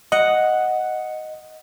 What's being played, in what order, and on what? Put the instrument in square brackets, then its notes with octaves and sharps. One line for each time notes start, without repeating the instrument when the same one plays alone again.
[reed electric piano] D#5 [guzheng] F#5